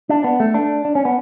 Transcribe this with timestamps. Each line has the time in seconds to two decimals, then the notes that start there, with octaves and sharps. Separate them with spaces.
0.09 D4
0.24 B3
0.40 A3
0.54 D4
0.85 D4
0.95 C#4
1.05 B3